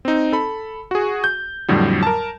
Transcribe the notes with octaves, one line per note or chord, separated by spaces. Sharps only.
C4 D#4
A4 B5
F#4 G#4
G6
F2 A2 D3 F#3 G3
A#4 A5